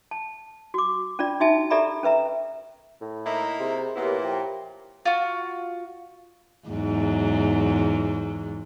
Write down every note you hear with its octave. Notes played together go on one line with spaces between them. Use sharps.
A5
F#4 D6
C#4 D4 F4 D5
D#4 F#4 E5 G#5 A5
G4 A4 D5 E5 A#5 B5
C#4 B4 E5 A#5
A2
A#3 D#4 E4
C3 G#4
A#2 A#3 B3 E4 G4 A#4 C#5
F3 G5
F4 F#4
E2 G#2 F#3